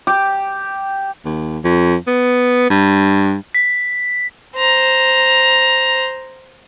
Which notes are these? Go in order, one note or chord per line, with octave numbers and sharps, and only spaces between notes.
G4
D#2
F2
B3
G2
B6
C5 A#5